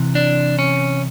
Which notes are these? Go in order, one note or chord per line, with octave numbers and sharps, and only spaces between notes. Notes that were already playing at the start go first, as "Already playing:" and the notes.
Already playing: C3 E3
D4
C#4